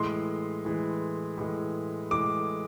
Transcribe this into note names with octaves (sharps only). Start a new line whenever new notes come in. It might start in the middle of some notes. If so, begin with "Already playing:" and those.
Already playing: A2 E3 G#3 C6
A2 E3 G#3
A2 E3 G#3
A2 E3 G#3 D6